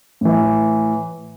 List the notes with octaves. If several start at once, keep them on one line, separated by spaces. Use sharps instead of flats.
A2 E3